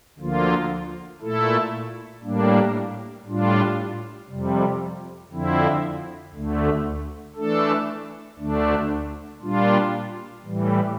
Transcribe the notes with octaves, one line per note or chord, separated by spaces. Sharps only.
D2 D3 F3 A#3 F4
A#2 A3 E4 A4
A2 G3 A#3 D4
A2 G3 D4 F4
F2 C3 G3
F2 D3 F3 C4 E4
D2 D3 A3
E3 A3 D4 A4
D2 D3 A3 D4
A#2 G3 D4 F4
A2 E3 G3